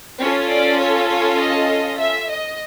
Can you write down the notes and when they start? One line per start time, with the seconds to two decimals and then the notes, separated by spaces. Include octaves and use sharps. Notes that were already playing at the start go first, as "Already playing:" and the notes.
0.20 C#4 F4 A4 C#5
0.50 D5
0.79 C#5
1.09 C#5
1.39 D#5
1.99 E5
2.29 D#5